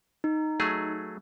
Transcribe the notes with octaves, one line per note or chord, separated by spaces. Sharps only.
D#4
F#3 A3 G#4